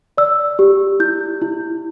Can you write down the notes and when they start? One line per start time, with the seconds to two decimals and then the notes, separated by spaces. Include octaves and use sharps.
0.18 D5 E6
0.59 G4
1.00 E4 G6
1.41 E4